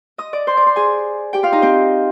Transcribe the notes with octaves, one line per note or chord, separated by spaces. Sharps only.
D#5 D#6
D5 D6
C5 C6
D5 D6
C5 C6
G#4 G#5
G4 G5
F4 F5
D#4 D#5
C4 C5